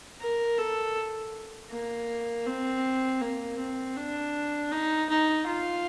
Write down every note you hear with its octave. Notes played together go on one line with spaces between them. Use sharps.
A#4
A4
A#3
C4
A#3
C4
D4
D#4
D#4
F4